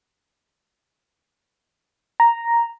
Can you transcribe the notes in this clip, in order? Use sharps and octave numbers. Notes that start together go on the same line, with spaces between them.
A#5